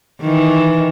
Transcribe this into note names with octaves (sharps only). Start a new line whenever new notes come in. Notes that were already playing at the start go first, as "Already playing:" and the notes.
D#3 E3